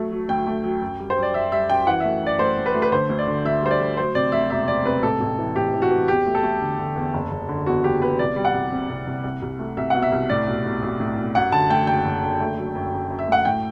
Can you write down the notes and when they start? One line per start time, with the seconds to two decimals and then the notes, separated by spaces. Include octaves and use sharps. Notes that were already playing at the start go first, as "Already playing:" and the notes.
Already playing: F#3 A3
0.11 F#3
0.29 D2 G5
0.47 A3
0.64 F#3
0.81 F#2
0.99 G3
1.10 C5
1.17 F#2
1.23 D5
1.34 F#2 E5
1.52 G3 E5
1.69 F#2 G5
1.87 E3 F#5
2.00 A3 E5
2.22 F#2 D5
2.39 A3 C5
2.57 A3
2.66 B4
2.74 A3
2.82 B4
2.92 D3 C5
3.10 D2
3.19 D5
3.27 D3
3.45 D2 E5
3.62 G3 C5
3.71 D5
3.80 D2
3.97 F#3 C5
4.15 C3 D5
4.32 D2 E5
4.50 E1 E5
4.68 C3 D5
4.85 C3 B4
5.03 A1 A4
5.20 A1
5.38 E3
5.56 A1 G4
5.73 E3
5.82 F#4
5.91 E3
6.08 E2 G4
6.26 A3
6.35 A4
6.43 A3
6.61 D3
6.79 D3
6.96 E2
7.14 F#1
7.31 F#1
7.49 D3
7.66 E2 F#4
7.84 F#1 G4
8.01 E2 B4
8.19 C2 D5
8.36 G3
8.45 F#5
8.54 C2
8.71 C3
8.89 C2
9.07 C2
9.24 C2
9.42 C2
9.59 A3
9.77 C2 E5
9.90 B2 F#5
10.02 E5
10.12 C2
10.29 A2 D5
10.47 B1
10.65 B1
10.82 B1
11.00 A2
11.17 B1
11.35 F#2 F#5
11.52 D3 A5
11.70 A3 G5
11.87 F#1 G5
12.05 F#1
12.23 D3
12.40 A3
12.58 F#3
12.75 F#2
12.93 F#2
13.10 F#2
13.19 E5
13.27 A3 F#5
13.45 A2 G5